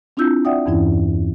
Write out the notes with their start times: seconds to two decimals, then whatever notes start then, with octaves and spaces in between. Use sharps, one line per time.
0.17 C4 D4 E4 F4 E6 G6
0.45 D5 E5 F#5 G5 D#6
0.66 E2 G2 E3 C#4 E4